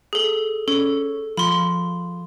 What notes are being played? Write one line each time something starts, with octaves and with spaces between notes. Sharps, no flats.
G#4 A4
C#4 A4
F3 B5 C6